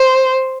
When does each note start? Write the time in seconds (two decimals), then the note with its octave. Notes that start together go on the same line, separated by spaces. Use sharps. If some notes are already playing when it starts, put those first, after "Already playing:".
Already playing: C5